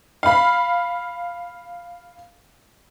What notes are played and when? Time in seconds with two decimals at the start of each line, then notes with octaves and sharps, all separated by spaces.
0.23 F5 B5